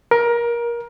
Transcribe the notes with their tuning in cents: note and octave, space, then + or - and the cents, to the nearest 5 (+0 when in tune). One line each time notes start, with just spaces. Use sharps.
A#4 +20